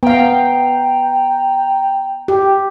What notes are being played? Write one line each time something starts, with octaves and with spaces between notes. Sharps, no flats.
B3 F5 G5 A#5
G4